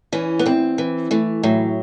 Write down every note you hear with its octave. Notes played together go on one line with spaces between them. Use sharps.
E3 C#4
B3
E2 C4
E3
E3 A3
A2 F#3